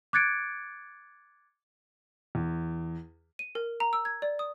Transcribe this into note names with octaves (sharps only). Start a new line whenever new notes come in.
D6 F#6 G#6 A6 C#7 D7
E2
D#7
A#4
A#5
E6
G#6
D5
D#6